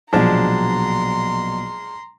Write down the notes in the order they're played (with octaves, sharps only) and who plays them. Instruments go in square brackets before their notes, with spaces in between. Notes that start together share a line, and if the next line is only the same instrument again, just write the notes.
[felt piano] A#1 B2 F#3 [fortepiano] F3 G#3 D4 [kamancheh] A#5 C6